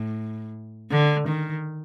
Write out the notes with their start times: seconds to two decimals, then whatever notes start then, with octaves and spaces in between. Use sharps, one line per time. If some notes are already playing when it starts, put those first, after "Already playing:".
Already playing: A2
0.91 D3
1.28 D#3